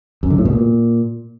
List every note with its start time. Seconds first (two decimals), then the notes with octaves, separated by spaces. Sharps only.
0.23 F#2
0.30 D3
0.38 A2
0.45 B2
0.53 A#2